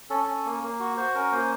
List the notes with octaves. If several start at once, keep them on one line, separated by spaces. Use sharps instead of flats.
C#4 A4
C#4
A#3
A#3
F#4
F#4 C5
C#4 A#4
A#3 C5